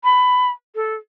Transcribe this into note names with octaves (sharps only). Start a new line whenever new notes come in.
B5
A4